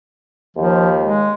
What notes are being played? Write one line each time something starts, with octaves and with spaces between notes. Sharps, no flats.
D#2 F3
G#3